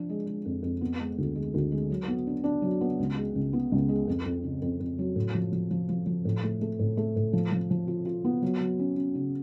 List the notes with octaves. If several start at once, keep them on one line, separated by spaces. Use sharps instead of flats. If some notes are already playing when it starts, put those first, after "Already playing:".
Already playing: F3 D4
G#3
G#3
F2
F2
B3
G#3
D2
G#3
D2
G#3
F#3
B3
D4
D4
F#3
B3
C#2
G#3
C#2
B3
C#2
G#3
F2
F2
C#3
F2
F2
F#3
A2
F3
F3
F3
F3
F3
A2
A3
A3
A2
A3
A2
F3
F3
F3
F4
F4
B3
F#3
F#3
C#4
C#4
C#3